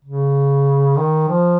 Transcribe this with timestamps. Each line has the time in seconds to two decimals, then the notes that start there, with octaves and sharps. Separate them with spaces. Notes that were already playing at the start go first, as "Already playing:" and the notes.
0.05 C#3
0.97 D#3
1.29 F3